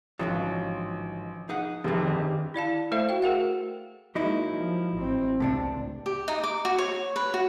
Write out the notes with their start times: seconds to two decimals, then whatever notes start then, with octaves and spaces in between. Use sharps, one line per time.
0.19 A1 G#2 D3 F3 F#3 F4
1.49 D#4 G#4 F#5
1.84 F1 F2 D#3 C4 G4 G#4
2.07 G1 D5
2.54 E4 D5 F5 A5
2.92 A3 A4 C5 E5 F5
3.09 F#4 F5 G5
3.22 G#4 A#4 F5 F#5
4.15 F#3 G#3 A#3 D#4 E4
4.55 F3
4.94 A1 C4
5.40 C#2 A2 C3 D4
6.06 G4
6.28 D#4
6.44 D6
6.65 F#4
6.78 C#5
7.16 B4
7.34 F#4